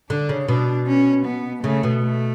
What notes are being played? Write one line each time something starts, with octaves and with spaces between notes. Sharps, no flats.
D3 D4
C#3
B2 D4
C#4
B3
C#3 A3
B2
A3